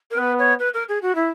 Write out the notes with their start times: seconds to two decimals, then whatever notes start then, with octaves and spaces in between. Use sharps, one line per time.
0.11 A#4
0.17 B3 B4
0.39 C#5
0.59 B4
0.74 A#4
0.88 G#4
1.02 F#4
1.15 E4